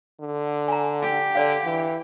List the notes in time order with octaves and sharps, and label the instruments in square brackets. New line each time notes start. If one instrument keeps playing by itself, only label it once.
[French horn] D3
[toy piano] G#5 A#5
[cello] G4
[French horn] D3 [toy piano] D5 F5
[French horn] E3